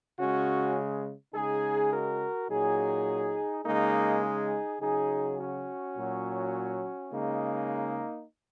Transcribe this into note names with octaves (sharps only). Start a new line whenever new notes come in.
C#3 G#3 C#4 F#4
C#3 G#3 D#4 G#4
F#4 A#4
A#2 F#3 D#4 G#4
C#3 G#3 A#3 D#4
D#4 G#4
C#3 F#3 D#4 G#4
C#4 F#4
A#2 F#3
C#3 G#3 A#3 D#4